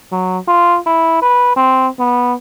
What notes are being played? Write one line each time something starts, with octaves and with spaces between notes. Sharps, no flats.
F#3
F4
E4
B4
C4
B3